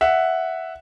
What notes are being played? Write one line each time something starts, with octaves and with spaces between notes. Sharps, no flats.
E5 F#5